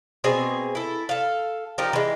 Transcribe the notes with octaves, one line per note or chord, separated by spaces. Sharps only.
B2 C4 G#4 G#5
E4 A4
A4 F5
F3 D#4 G4 A#4
E3 G#3